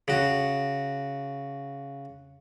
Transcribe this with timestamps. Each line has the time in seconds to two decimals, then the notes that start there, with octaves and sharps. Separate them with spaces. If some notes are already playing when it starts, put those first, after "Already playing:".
0.08 C#3 F#4